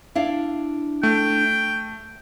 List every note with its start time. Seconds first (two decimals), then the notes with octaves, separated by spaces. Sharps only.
0.15 D4 E4 F5
1.03 A3 G5